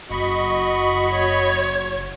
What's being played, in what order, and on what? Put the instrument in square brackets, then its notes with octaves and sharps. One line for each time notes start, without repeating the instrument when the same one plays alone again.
[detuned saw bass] F#1 [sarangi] F#4 [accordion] D#5 B5 C#6
[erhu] C#5